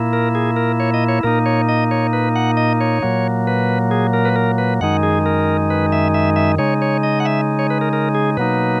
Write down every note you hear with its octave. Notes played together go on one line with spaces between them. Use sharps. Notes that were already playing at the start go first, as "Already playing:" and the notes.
Already playing: A#2 A#3 E4
A#4
G#4
A#4
C#5
D#5
C#5
A#2 A#3 D#4 A#4
C#5
D#5
C#5
B4
F#5
D#5
C#5
A#2 F#3 A#3
B4
G#4
A#4
B4
A#4
B4
F#2 D#3 G#3 D#4 F#5
G#4
A#4
B4
E5
E5
E5
C#3 G#3 D#4 C#5
C#5
D#5
F#5
E5
C#5
B4
A#4
A#4
G#4
B2 F#3 A#3 D#4 B4